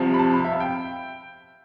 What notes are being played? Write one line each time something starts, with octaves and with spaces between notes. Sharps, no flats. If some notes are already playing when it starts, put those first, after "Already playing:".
Already playing: C2 C3 F3
B5
A5
B5
E5
F5
G5